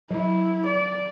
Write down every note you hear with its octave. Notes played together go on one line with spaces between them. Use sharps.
F#3 E4
D5